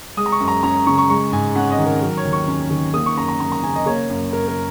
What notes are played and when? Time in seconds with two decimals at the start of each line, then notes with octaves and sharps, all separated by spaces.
0.17 G#3 D#6
0.26 A#5
0.32 C#6
0.40 F#2
0.48 A#5
0.63 C#4 A#5
0.87 C#3 C#6
0.98 C#6
1.10 G#3 C#6
1.32 G#2 G#5
1.56 C#4 F#5
1.72 D#5
1.79 D#3
1.86 A#4
2.02 F#3 A#4
2.17 C#5
2.25 D#2
2.33 C#6
2.48 C#4
2.71 D#3
2.94 A#3 D#6
3.06 C#6
3.17 F#2 A#5
3.29 A#5
3.40 F#2 A#5
3.52 A#5
3.63 C#3 G#5
3.76 D#5
3.86 A#3 C#5
4.10 F#2
4.33 F#2 A#4
4.48 A#4